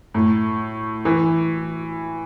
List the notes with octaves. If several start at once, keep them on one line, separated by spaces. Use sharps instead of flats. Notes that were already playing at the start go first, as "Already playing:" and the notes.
A2
E3